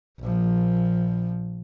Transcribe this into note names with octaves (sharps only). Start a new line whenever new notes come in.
A#1 F3